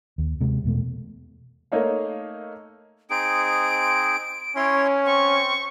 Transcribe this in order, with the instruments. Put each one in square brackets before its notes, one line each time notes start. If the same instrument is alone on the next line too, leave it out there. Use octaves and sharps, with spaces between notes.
[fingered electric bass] D#2
C3 G#3
E2 B2 A3
[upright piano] A3 A#3 D#4 C#5 F5
[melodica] C4 D#4 G#4 [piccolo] D7
[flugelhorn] C#4 [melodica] E4 C#5 C6
[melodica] C4 [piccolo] C#6